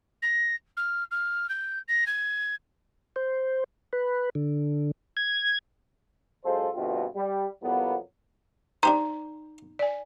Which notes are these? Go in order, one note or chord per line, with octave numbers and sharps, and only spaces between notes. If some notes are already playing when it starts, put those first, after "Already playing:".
A#6
F6
F6
G6
A#6
G#6
C5
B4
D3
G#6
F#2 G#3 F4 A4 C5
G2 B2 D3 A3 C4 F4
G3
C2 F2 F#3 A#3 B3
D4 D#4 G4 C5 A#5
D5 G#5